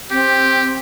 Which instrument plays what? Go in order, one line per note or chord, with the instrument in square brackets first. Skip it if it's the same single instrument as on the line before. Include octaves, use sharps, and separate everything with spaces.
[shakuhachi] C4 [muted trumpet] G4